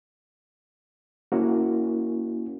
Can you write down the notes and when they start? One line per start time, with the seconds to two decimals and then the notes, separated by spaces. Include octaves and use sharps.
1.32 A#3 C#4 E4 F#4 A#4